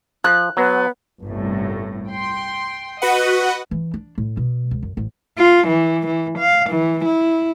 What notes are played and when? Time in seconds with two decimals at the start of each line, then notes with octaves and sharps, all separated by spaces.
0.24 F3 F#6
0.57 F#3 B3
1.22 G1 C2 A2
2.09 G5 C6
3.02 F#4 B4 D#5 F#5
3.71 E3
3.94 D4
4.18 A2
4.37 B2
4.71 C#2
4.82 F#2
4.97 A1
5.38 F4
5.68 E3
6.06 E3
6.39 F5
6.70 E3
7.05 E4